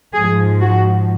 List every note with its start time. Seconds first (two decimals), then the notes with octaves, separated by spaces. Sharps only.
0.13 G#2 F3 G#4
0.60 F#4